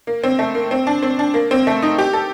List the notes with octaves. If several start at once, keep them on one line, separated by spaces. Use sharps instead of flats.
A#3
C4
A3
A#3
C4
D4
C4
D4
A#3
C4
A3
D#4
G4
A4